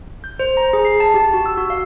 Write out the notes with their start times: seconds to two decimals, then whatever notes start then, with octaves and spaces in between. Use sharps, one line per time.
0.24 G6
0.40 C5
0.57 A#5
0.73 G#4
0.85 C7
1.00 A5
1.14 G4
1.33 F#4
1.46 E6
1.58 F#4
1.70 F5